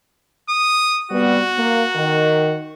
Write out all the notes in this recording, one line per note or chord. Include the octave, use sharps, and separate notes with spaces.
D#6
C3 G3 B3 F#4
A#3
D#3